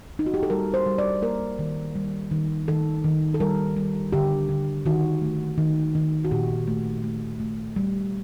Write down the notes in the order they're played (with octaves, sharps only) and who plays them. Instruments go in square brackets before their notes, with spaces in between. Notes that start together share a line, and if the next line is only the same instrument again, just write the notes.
[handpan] D#4
F#4
G4
A4
G3 A#4
C5
G3
D5
A#3 A#4
D#3
G3
D#3
D#3 A4
D#3
A4
G3 A#4
G3
D3 G4
D3
D#3 F#4
A3
D#3
D#3
F#4
A#2 G4
A3
A3
A3
G3